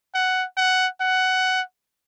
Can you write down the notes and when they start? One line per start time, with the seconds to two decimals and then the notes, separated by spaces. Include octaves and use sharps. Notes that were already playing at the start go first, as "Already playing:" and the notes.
0.14 F#5
0.57 F#5
1.01 F#5